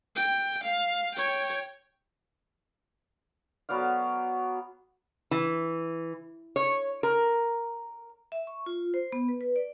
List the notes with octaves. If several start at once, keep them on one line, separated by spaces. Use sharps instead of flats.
G5
F5
C#5 G5
F#3 B3 D5 F5
E3
C#5
A#4
E5
C#6
F4
C5
B3
B4
B4
D5